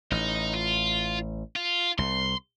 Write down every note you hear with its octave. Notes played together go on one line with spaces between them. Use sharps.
A1 D#4
F4
F4
C2 C6